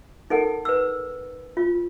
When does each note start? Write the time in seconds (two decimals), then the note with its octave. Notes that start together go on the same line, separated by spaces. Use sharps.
0.30 D#4 A4 A#4 F#5
0.65 B4 E6
1.57 F4